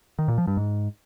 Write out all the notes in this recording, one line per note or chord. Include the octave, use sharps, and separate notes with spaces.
D#3
A#2
F3
G2
G#2